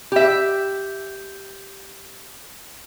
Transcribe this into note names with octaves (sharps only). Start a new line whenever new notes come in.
G4 E5